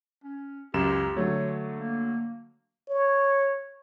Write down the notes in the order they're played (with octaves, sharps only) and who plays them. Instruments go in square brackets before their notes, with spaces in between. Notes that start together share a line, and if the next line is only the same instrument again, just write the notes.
[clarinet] C#4
[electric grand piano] C#2 F#2 E7 [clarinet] G4
[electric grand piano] D3 F#3 A3 [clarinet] C#5
[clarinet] A#3
[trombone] C#5